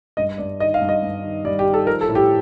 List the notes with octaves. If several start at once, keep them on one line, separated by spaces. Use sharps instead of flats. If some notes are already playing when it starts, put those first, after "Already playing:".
G2 D#5
G2 D5
D#3 D#5
F5
G2
D#5
G2
D#3
G3 D5
G4
D#3
A4
F3 A#4
A4
A2
G4